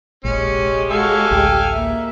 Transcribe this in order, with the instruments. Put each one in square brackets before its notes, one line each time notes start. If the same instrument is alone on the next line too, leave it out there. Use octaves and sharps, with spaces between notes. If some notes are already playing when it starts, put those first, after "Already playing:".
[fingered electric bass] F1 A#1 [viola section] G#3 G4 [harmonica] C#4
[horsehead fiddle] F#4 C#5 [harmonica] A4 F5 G#5
[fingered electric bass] A1 D2 [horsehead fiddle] G5
[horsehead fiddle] A#3 E5